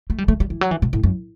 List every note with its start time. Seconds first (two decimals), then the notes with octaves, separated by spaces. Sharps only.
0.10 A3
0.18 G3
0.28 A3
0.40 G3
0.50 E3
0.61 F#3
0.71 E3
0.82 B2
0.93 A2
1.03 F#2